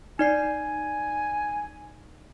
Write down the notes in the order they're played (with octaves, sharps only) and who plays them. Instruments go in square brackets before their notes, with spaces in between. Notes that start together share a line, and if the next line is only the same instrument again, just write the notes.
[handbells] D#4 D5 C7 [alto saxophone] G#5